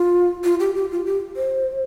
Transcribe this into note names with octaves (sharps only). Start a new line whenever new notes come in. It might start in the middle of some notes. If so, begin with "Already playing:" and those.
Already playing: F4
F4
G4
G4
F4
G4
C5